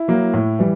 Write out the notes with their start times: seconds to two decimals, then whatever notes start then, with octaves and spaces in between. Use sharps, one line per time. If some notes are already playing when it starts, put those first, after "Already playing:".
Already playing: E4
0.08 F#3 A#3
0.34 A2
0.59 E3 G3